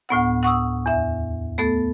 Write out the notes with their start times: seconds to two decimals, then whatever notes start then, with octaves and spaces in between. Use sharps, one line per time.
0.09 D2 A2 B3 F#5
0.43 F#5 C#6 D#6 E6
0.86 E2 E5
1.58 A3 B3 A4